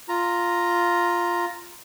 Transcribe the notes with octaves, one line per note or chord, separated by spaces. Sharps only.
F4 A#5